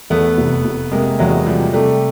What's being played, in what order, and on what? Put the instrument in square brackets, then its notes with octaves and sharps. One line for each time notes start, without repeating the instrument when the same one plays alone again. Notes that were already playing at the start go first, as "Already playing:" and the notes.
[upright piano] E2 [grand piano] A3 B3
[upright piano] F1
F1
[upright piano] C3 [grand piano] G#3 A#3
[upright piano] E2 [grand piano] F#3 G#3
[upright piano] C3 [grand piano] F3 G3
[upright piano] C3 [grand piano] G3 A3